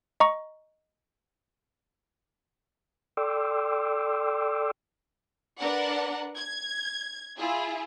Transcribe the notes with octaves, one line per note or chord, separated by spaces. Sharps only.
D#5 A#5 C#6
A4 D5 G5 C6 D6 E6
D4 A#4 B4 D5 F#5
G#6
E4 F4 G#4